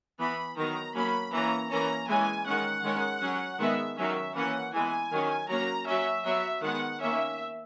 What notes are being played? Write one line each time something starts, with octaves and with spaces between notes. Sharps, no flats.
E3 B3 B5
D#3 F#3 B3 A#5
F#3 A#3 C#4 B5
E3 A#3 C#4 A#5
E3 A#3 C#4 A#5
E3 G#3 C#4 G#5
D#3 G#3 C#4 F#5
D#3 G#3 C#4
F#3 C#4
D#3 G#3 B3 E5
D#3 F#3 C#4 E5
E3 A#3 C#4 F#5
E3 G#3 B3 G#5
D#3 F#3 C#4
F#3 A#3 C#4 A#5
F#3 C#4 E5
F#3 B3 E5
D#3 G#3 B3 F#5
D#3 A#3 C#4 E5